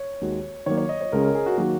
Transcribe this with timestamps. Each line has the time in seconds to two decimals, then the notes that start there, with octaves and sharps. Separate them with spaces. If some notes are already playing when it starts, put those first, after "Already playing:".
Already playing: C#5
0.21 D#2 D#3 G#3 F#4
0.66 D#3 F#3 A#3 C#5
0.78 C#5
0.89 D#5
1.01 C#5
1.12 C#2 C#3 G#3 C#4 G#4 A#4
1.24 A#4
1.35 G#4
1.46 F#4
1.58 D#3 F#3 A#3 F#4